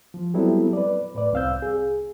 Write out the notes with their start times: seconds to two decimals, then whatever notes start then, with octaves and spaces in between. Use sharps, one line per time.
0.14 F3
0.34 F#3 G3 B3 C4 E4 A4
0.73 B4 D5
1.15 A2 B4 D5
1.33 C2 C4 F5 E6 G6
1.62 G#4